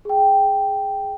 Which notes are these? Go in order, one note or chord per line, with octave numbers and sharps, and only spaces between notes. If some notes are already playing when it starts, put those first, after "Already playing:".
G#4 G5